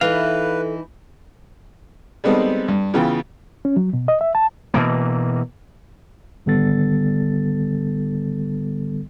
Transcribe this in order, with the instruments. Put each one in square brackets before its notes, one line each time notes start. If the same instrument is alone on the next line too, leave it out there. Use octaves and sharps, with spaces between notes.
[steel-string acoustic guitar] E3 D#4 E4 [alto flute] A4 [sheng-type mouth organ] B4 [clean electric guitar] F5
[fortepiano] G3 G#3 B3 C4 D#4 A4
G2
C#3 E3 B3 F4 G5
[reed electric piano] C#4
F#3
B2
D#5
E5
A5
[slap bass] B2 E3 A#3
[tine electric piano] G#1 D3 G3 B3 A4 A6